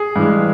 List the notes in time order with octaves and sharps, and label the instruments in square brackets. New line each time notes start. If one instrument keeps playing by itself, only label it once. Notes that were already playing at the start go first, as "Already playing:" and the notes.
Already playing: [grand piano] G#4
G2 E3 G#3